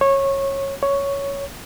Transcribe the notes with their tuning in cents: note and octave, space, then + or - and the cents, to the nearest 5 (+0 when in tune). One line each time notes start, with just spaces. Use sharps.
C#5 -20
C#5 +5